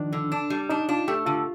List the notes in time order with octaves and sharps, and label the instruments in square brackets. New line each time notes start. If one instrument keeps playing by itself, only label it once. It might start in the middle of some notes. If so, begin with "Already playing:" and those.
Already playing: [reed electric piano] D#3 F3 D4
[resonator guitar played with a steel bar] D3
D4
G3
[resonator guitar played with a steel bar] D4 [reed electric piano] D#4
[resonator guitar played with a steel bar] D4 [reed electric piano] F4
[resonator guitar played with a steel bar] A3 [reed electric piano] G4
[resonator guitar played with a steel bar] D3 [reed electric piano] F4